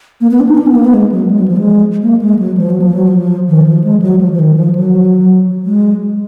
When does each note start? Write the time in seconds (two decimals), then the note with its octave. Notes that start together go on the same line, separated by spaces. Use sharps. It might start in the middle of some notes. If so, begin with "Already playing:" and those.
0.21 A#3
0.31 B3
0.40 D4
0.49 D#4
0.57 D4
0.66 B3
0.75 A#3
0.85 B3
0.94 G#3
1.12 F#3
1.31 G#3
1.40 F#3
1.48 F3
1.57 G#3
2.02 A#3
2.22 G#3
2.39 F#3
2.57 F3
2.70 F#3
2.82 F3
2.94 F#3
3.08 F3
3.49 D#3
3.66 F3
3.84 G#3
4.02 F#3
4.21 F3
4.32 F3
4.39 D#3
4.56 F3
4.75 F#3
5.66 G#3